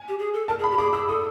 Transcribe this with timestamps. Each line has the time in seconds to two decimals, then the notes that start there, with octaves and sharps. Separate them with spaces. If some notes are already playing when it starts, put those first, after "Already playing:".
Already playing: G#5
0.08 G4
0.19 G#4
0.34 A4
0.48 A#4 A5
0.59 G#4
0.64 B5
0.72 G4
0.78 G#4 D6
0.93 G#4 E6
1.08 A4 D#6